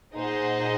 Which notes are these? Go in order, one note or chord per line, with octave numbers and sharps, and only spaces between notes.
A#2 D#4 G#4 C5 D#5 F#5